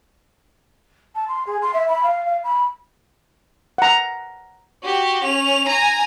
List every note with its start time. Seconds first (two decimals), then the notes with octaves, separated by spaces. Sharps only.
1.15 A5
1.28 C6
1.47 G#4
1.62 C6
1.74 E5
1.88 B5
2.04 F5
2.26 F5
2.44 B5
3.78 F#5 A#5
4.83 F#4 G4
5.24 C#4 F7
5.67 G#5 A#5